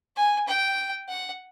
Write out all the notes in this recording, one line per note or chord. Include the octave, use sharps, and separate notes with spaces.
G#5
G5
F#5